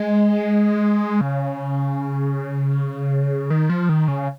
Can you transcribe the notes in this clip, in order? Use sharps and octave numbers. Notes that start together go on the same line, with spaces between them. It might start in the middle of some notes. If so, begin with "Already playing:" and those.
Already playing: G#3
C#3
D#3
F3
D#3
C#3